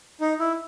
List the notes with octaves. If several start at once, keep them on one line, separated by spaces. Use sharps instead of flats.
D#4
E4